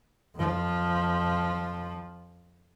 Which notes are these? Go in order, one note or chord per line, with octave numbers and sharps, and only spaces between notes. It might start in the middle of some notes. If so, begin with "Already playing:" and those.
F2 F3